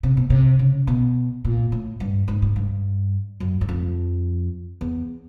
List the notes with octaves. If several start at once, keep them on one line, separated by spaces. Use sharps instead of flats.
C3
B2
C3
C#3
B2
A#2
A2
G2
G#2
G#2
G2
F#2
F#2
F2
E2